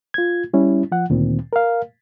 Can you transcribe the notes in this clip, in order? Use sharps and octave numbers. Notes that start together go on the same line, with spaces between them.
F4 G#6
G3 C#4 E4
F3 F#5
D2 A#2 D#3 C4
A#4 F5